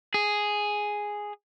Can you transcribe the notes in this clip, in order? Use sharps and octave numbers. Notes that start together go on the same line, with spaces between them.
G#4